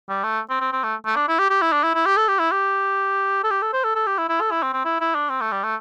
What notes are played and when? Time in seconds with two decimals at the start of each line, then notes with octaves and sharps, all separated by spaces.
0.09 G3
0.23 A3
0.49 C4
0.60 C4
0.72 C4
0.83 A3
1.05 A3
1.16 D4
1.28 E4
1.39 G4
1.50 G4
1.62 E4
1.72 D4
1.83 E4
1.94 E4
2.06 G4
2.17 A4
2.28 G4
2.39 E4
2.51 G4
3.43 A4
3.50 G4
3.62 A4
3.73 C5
3.84 A4
3.95 A4
4.06 G4
4.18 E4
4.29 E4
4.40 A4
4.51 E4
4.62 C4
4.73 C4
4.85 E4
5.00 E4
5.15 D4
5.29 C4
5.41 A3
5.52 G3
5.63 A3